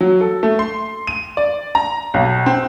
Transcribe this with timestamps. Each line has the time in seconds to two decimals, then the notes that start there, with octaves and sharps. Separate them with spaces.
0.01 F#3
0.21 A4
0.43 A3
0.59 C6
1.07 D#7
1.37 D5
1.75 A#5
2.14 B1
2.46 C4